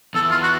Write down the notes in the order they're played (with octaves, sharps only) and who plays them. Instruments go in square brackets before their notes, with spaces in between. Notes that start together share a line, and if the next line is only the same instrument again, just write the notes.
[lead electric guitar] E2 [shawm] A4
[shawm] F4
F#4